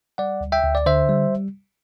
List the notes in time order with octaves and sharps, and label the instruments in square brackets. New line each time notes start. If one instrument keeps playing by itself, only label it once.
[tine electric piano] G3 D5 F#5
D2
E5 G5
D2
D5
D3 C5 E5
G3